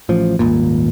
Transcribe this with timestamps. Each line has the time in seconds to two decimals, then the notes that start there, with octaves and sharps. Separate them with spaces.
0.09 A1 F3
0.39 D#1 G#1 A#2